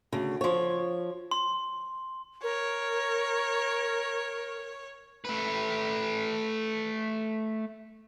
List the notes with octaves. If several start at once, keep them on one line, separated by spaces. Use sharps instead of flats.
D2 C#3
F3 C#5
C6
A#4 C#5
A3 B4